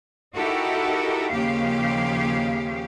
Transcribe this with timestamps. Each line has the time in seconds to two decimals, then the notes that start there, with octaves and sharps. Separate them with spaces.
0.34 D#4 E4 F#4 G4 A4 A#4
1.31 D#2 C#3 F3 A#3 G4 F5